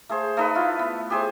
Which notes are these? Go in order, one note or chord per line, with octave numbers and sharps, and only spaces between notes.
A3 G#4 C5
A3 D#4 B4
E4 F4
B3
G4 G#4 C5